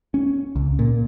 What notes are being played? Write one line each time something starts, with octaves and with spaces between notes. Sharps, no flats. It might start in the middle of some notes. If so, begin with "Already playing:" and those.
C#4
C#2
A#2